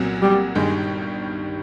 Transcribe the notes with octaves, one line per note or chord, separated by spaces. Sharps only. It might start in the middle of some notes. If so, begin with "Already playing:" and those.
Already playing: C2 A#2 F#3 B3
G3
G1 G2 D#3 G3 G#3